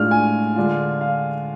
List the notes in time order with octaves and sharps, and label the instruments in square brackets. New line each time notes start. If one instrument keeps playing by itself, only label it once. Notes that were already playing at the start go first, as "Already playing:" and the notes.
Already playing: [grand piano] A2 G#3 D4 F4 F6
G#5
D3 G#3 D4 F4
F5